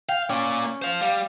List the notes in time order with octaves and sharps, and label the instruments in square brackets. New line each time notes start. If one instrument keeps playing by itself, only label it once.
[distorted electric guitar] F5 [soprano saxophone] G5
[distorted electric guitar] A#3 D5 [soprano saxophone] C#4
[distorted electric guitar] C5 F5
[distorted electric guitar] G3 [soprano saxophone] F5